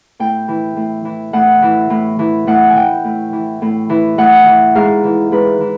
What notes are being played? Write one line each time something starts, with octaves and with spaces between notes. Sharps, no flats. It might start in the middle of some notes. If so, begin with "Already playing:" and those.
A2 G5
E3
A2
E3
A2 F#5
E3
A2
E3
A2 F#5
G#5
E3 G5
A2
E3
A2
E3
A2 F#5
E3
G#2 F5
E3
G#2 B4
E3